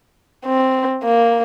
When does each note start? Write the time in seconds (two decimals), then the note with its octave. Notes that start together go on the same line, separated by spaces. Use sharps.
0.46 C4
1.04 A#3